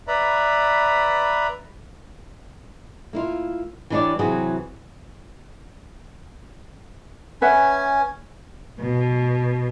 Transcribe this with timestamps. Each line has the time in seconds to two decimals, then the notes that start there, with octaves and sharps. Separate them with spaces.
0.08 B4 D5 E5 A#5 B5
3.13 A#3 E4 F4
3.90 E3 G3 D4 G#4 C#5 D5
4.19 C3 E3 F#3 F#4 G#4
7.42 C#4 B4 E5 F#5 G#5
8.80 B2